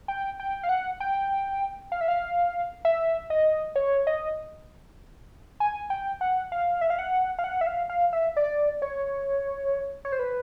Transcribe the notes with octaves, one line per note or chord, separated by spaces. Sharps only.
G5
G5
F5
F#5
G5
F5
E5
F5
E5
D#5
C#5
D#5
G#5
G5
F#5
F5
E5
F5
F#5
F5
F#5
E5
F5
F5
E5
D5
C#5
C#5
C5
B4